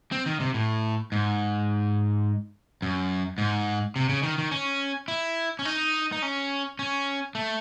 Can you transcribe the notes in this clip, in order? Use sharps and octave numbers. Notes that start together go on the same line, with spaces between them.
C4
D#3
C3
A2
G#2
F#2
G#2
C3
C#3
D#3
D#3
C#4
E4
C#4
D#4
D#4
C#4
C#4
A3